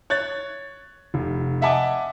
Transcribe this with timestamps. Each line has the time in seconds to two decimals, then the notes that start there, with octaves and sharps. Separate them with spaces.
0.10 C#5 F#6 G#6 A6
1.14 F1
1.62 D#5 E5 F#5 G#5 A5 D6